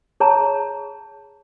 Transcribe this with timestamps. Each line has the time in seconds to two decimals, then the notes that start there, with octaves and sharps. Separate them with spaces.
0.20 G#4 C#5 A5 A#5